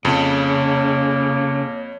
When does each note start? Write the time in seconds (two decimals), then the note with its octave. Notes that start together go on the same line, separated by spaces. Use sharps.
0.05 F2 C#3 A#3 C#5